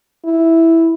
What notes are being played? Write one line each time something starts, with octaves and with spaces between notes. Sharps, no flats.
E4